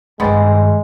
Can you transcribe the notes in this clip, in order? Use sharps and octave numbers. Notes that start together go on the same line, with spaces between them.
G2 D#3 G#3 B3 C4 D5